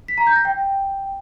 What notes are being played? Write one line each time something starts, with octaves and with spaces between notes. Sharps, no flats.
B6
A#5
G6
A#6
G5